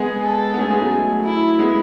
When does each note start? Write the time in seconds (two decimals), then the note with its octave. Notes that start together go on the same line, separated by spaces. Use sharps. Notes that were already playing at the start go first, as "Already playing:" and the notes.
Already playing: G#3 B3 G#4
0.25 A4
0.54 B3
0.58 A3 C#4 G#4
0.70 G#3 B3
0.81 F#3 A3
1.25 E4
1.59 G#3 B3